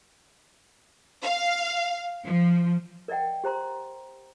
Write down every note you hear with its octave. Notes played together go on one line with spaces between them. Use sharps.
F5
F3
A#4 D5 D#5 F#5 G5
G4 C5 A#5 C6